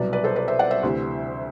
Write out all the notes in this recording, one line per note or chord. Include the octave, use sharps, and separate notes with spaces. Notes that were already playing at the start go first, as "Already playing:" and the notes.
Already playing: C2 B2 F#3 B4 D5
B4 D5
A4 C5
B4 D5
C5 E5
D5 F#5
C5 E5
D2 C3 E3